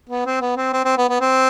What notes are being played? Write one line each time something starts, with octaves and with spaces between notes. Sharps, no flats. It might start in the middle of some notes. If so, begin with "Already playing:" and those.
B3
C4
B3
C4
C4
C4
B3
B3
C4